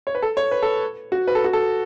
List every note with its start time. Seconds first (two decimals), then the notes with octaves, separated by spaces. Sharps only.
0.07 C#5
0.15 B4
0.22 A4
0.37 C#5
0.51 B4
0.62 A4
1.12 F#4
1.27 B4
1.35 A4
1.44 F#4
1.53 A4